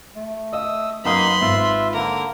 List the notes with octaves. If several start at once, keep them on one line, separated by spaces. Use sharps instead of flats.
A3
D#5 E5 D#6 E6
F#2 A#3 D#4 B4 F#5 B5 C6 D#6
G#1 F4 E5
D3 A#3 A#4